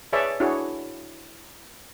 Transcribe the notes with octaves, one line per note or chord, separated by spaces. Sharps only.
G#4 B4 C#5 D5 E5 A5
D4 E4 F#4 G#4 C#5